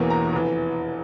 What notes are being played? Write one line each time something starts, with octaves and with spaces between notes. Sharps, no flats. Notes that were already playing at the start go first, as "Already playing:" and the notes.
Already playing: E1 E2 E3 A#3
A#5
F1 E3